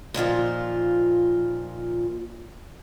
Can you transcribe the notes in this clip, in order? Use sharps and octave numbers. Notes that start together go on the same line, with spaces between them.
A#2 D#3 F3 F4